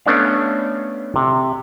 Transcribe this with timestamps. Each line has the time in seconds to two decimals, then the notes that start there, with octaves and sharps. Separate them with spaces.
0.06 A3 B3 C#4 D4 D5 F5
1.16 C3